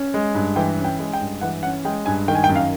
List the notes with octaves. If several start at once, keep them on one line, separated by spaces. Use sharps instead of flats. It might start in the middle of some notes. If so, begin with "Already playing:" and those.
Already playing: C#4
G#3
G2
E3 G5
C#4
G5
G#3
G5
G2
E3 F#5
C#4 F#5
G#3 G5
G2 G#5
D#3 G5
G#5
G5
F#2
F5